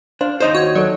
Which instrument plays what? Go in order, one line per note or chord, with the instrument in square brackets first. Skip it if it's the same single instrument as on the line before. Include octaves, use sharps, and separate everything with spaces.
[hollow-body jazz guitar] D4 [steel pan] C5 F5
[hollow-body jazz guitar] D#2 D#4 C5 [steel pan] C#5 D#5
[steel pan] F#4 [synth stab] C#5
[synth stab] F#3 [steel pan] A4 C#5 D5